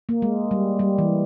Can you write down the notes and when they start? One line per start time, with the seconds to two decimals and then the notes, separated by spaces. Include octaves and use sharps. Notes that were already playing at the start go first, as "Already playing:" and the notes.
0.09 A#3
0.22 G#3
0.51 G3
0.79 G3
0.98 E3